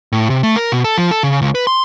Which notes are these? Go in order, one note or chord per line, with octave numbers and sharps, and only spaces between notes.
A2
C3
A3
A#4
B2
A4
F3
A4
C#3
C#2
B4
C6